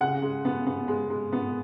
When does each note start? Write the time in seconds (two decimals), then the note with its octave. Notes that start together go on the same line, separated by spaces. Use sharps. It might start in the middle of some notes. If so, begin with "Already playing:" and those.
0.01 C#3 F#5
0.22 G#3
0.45 B3
0.66 B3
0.88 G#3
1.10 G#3
1.32 B3